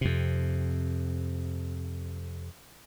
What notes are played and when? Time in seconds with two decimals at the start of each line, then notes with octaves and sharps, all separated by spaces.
0.01 F2 C3